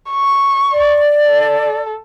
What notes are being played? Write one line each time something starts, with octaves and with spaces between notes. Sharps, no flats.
C#6
D5
A4